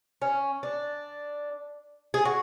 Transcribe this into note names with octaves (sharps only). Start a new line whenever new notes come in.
C#4
D4
G#4
F#4